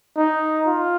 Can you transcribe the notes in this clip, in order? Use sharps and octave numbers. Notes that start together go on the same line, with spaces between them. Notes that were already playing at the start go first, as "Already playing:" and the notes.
D#4
F4